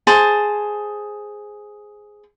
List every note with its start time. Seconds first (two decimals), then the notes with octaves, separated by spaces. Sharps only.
0.07 G#4 C5 A5